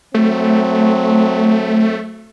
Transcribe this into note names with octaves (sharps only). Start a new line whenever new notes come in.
F#3 A3 C4